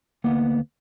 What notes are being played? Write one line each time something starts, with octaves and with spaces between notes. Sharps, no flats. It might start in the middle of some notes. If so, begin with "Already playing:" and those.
D2 A#3 B3 F#5